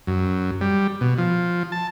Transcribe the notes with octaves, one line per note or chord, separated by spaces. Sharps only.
F#2
G3
B2
F3
A5